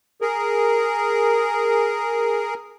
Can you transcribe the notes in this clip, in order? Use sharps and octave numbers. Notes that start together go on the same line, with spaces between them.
G#4 A#4